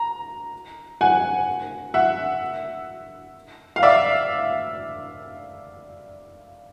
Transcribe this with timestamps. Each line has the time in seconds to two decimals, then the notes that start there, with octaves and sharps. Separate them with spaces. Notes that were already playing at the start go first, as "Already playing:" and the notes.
Already playing: A#5
1.01 F#5 G#5
1.94 E5 F#5
3.76 F5
3.83 D5 E5